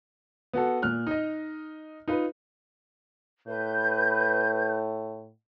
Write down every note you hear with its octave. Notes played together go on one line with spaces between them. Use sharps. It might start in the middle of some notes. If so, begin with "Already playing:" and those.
B3 F#4 A4
A#2 F6 F#6
D#4 D#5
D#4 F4 B4
A2 B4 G6